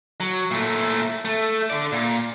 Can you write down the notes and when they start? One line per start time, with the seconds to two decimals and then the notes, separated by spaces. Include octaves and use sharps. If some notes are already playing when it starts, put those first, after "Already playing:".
0.20 F#3
0.51 A#2 A3
1.25 A3
1.70 D3 D5
1.92 A#2